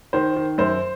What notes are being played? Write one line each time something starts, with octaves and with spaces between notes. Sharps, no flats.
D#3 C5
D#3
F#2 C5